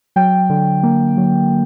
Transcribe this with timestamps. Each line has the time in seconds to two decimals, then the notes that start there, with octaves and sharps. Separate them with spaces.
0.16 F#3 G5
0.50 D3
0.83 A#3
1.17 F#3